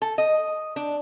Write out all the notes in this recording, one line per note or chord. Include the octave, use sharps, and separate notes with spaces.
A4
D#5
D4